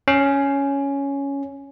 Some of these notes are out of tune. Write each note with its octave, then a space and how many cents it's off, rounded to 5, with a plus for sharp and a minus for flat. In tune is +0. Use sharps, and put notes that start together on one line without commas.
C#4 +5